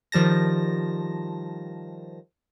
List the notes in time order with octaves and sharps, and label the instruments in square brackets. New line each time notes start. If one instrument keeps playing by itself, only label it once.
[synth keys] D#3 F3 G3 A5 A#6